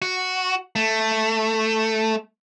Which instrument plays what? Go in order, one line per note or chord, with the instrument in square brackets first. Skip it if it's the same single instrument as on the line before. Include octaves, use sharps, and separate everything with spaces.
[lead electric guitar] F#4
A3